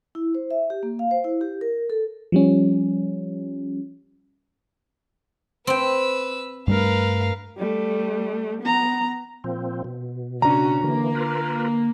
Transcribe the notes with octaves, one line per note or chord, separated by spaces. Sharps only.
E4
C5
E5
G4
A#3
F5
C5
E4
G4
A#4
A4
F3 G3 C#4
C4 B4 G5 E6
G2 G3 A3 A#4 B4 F5
G3 A3
B3 A#5
A#2 F3 C4
B2
C#3 C#4 D4 F#4 A#5
D3 E3 A#3
F4 A#4 B4